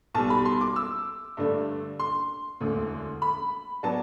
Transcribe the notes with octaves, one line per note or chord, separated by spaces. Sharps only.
B1 B2 G3 A5
B5
C6
D6
E6
G2 D3 A3 D4
C6
E1 D2 D3
B5
F#3 B3 D4 A5